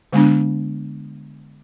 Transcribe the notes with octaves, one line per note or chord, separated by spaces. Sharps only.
D3 G#3 B3 D4